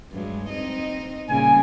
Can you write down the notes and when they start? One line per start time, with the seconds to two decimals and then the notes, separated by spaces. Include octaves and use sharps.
0.12 G2 F#3 G#3
0.49 C4 D#4 D#5
1.29 A#2 C#3 G3 G#5